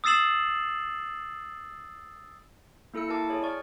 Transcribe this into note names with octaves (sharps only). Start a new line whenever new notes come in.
D#6 E6 A6 C7 E7 F#7
A#3 E4 A4 E6 C#7
E4 F#4 A#4 A5 D6
G#4 C#5
G#4 D5 C#6 F6